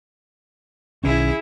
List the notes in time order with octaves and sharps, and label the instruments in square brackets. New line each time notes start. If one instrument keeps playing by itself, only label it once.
[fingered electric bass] B1 D#3 C#4 [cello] E4 G#4